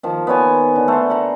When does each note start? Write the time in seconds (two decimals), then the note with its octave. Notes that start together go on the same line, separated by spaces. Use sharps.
0.03 D#3 F3
0.27 B3 D#4 C#5 G#5
0.76 D3
0.88 A3 C6
1.10 F#5 A#5